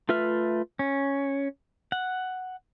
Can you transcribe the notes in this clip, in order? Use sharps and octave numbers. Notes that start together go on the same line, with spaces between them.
A3 F4 B4 E5 F6
C#4
F#5